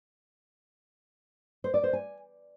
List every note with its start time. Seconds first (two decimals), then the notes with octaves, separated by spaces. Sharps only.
1.64 C5
1.74 D5
1.84 C5
1.93 G#5